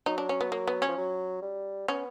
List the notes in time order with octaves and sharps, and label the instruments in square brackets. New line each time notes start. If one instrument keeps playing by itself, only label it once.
[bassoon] F#3 [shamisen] D#4
[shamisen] D4
C#4
B3
A#3
B3
C#4
[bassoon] F3
F#3
G3
[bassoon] B3 [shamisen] C#4